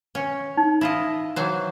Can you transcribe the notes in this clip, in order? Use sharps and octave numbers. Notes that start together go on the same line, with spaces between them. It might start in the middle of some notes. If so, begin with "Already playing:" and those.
C#4
D#4
E4 F4 D#5
E3 F#3 C5